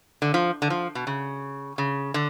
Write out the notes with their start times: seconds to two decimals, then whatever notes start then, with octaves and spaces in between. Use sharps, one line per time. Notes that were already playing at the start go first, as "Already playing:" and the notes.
0.22 D3
0.34 F3
0.62 D3
0.70 F3
0.95 B2
1.07 C#3
1.78 C#3
2.14 D3